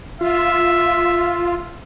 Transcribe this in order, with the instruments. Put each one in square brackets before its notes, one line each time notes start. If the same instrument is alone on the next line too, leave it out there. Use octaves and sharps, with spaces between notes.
[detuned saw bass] F4 [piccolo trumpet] E5